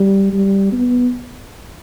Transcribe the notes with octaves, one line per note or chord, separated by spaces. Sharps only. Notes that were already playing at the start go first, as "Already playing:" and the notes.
Already playing: G3
G3
B3